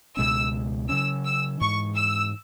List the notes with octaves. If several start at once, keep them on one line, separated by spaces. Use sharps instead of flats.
C#2 B2 G#3 C#4 E6
C#3 F#3 C#4 E6
E6
G#2 E3 G#3 C#6
E6